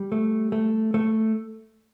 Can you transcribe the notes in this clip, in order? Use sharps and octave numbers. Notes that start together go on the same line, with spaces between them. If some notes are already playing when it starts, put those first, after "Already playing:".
Already playing: G3
A3
A3
A3